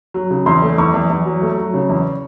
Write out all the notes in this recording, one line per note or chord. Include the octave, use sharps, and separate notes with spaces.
F#3
C#3
E2 C6
A3
E2 C#6
E2
E2
F#3
A3
F#3
C#3
E2